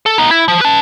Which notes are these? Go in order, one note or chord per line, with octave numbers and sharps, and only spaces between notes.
A4
B3 D#4
E4
F3
B4 A5